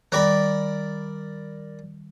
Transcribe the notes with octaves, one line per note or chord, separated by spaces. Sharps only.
D#3 G3 A#4 D5 B5